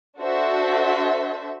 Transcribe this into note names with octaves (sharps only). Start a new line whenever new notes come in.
D4 F#4 A4 C5 E5